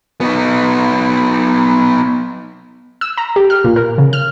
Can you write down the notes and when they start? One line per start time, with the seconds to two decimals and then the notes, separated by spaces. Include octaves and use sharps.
0.21 B3 D#4
3.01 E6
3.17 A#5
3.36 G4
3.50 F6
3.64 A#2
3.76 A#4
3.98 C#3
4.13 F6